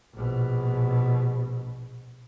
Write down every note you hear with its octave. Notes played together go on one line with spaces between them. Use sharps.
A#1 B2